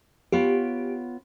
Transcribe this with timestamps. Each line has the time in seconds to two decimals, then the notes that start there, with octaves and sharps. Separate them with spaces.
0.32 B3 F4 G4 C#5